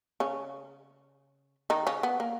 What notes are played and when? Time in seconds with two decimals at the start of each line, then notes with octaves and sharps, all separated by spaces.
0.20 C#3 C#4
1.70 D#3 D#4
1.87 C#3 C#4
2.03 B3
2.20 A#3